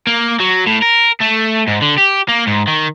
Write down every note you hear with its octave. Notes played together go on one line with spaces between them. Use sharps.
A#3
F#3
A2
A#4
A3
G#2
D3
G4
A#3
G#2
D#3